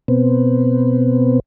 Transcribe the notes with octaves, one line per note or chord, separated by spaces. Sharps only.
B2 B3 C4